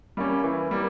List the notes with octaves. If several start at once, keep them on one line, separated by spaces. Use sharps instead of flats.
G3 A#3 C#4
E3
G3 A#3